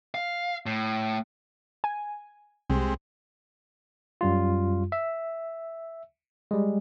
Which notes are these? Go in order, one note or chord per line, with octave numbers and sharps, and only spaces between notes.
F5
A2
G#5
C2 G#3 C4 G4
F#2 G3 F4
E5
G3 G#3